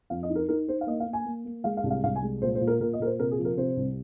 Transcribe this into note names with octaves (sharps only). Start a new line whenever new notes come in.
F2 F5
D#5
D#4
A#4
D#4 A#4
D#4 C5
F5
A#3 D#5
F5
A#3
G#5
A#3
A#3
G#3 F5
F5
C2
F5
C2 F5
G#5
G#3
A#2 C5
C5
A#2
A#4
A#2 A#4
D#5
A#2 A#4
C5
C3 A#4
G#4
F3
A#4
C3 C5
C2